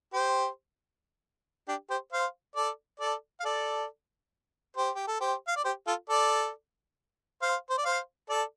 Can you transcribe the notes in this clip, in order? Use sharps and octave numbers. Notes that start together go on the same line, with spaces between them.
G4 C5
D4 G4
G4 C5
C5 F5
A4 D5
A4 D5
F5
A4 D5
G4 C5
G4
A4
G4 C5
F5
D5
G4 C5
F4 A4
A4 D5
C5 F5
C5
D5
C5 F5
A4 D5